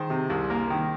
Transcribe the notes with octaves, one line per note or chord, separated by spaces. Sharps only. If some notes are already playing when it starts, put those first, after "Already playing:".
Already playing: D#3 G#4 C5
C3
C2
A#3
D#3